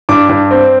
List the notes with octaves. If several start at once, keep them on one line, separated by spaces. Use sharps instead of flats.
G2 D6
G2
C4